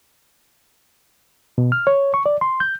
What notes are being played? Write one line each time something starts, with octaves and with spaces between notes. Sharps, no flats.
B2
F6
C#5
C#6
D5
C6
G6